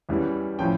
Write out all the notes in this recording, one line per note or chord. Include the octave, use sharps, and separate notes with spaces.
E2 E3 G3 C#4
A2 F3 C#4 G5